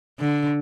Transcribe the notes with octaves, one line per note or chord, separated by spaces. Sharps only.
D3